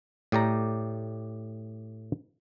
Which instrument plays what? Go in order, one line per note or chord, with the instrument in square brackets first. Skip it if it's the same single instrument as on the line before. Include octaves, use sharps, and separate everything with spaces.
[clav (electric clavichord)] A2 G4 D5 A#5